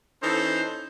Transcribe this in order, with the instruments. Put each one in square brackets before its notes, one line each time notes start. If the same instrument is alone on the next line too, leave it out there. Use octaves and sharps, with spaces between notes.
[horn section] E3 C#4 D#4 A4 C5